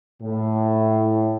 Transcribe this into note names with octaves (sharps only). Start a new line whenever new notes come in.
A2